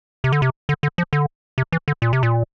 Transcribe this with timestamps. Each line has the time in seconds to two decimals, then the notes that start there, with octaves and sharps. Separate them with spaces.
0.24 C3
0.32 D3
0.42 C3
0.69 D3
0.83 D3
0.98 F3
1.13 D3
1.58 C3
1.72 E3
1.88 D3
2.02 A#2
2.13 C3
2.23 A#2